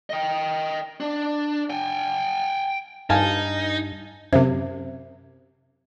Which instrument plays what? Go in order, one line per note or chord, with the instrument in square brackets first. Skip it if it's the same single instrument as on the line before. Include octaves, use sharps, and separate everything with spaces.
[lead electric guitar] D#5 G5
D4
G5 G#5
[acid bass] G2 [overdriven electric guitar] D#4 [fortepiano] F5 G#5 A5
[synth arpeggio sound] F#2 C3 [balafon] C5 E5